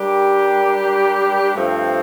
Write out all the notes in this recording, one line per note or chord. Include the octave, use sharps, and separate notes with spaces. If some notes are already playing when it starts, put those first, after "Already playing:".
Already playing: G3 D4 G4 A#4
G2 F3 A3 C4